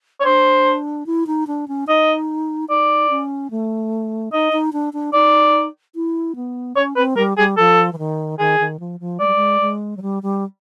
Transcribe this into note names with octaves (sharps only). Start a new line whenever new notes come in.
C#5
D4 C5
E4
D#4
D4
C#4
D#4 D#5
D#4 D5
C#4
A3
D#4 D#5
D#4
D4
D4
D#4 D5
E4
B3
C#4 C#5
C4 B4
G3 A#4
G3 G#4
F3 A4
E3
D#3
D#3 G#4
D#3
F3
F3
G#3 D5
G3
G#3
G#3
F#3
G3
G3